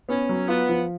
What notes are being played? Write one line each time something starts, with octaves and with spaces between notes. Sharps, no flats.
B3 C#4
F#3
B3 F4
F3